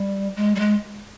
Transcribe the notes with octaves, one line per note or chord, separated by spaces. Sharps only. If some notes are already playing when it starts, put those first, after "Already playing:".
Already playing: G3
G#3
G3
G#3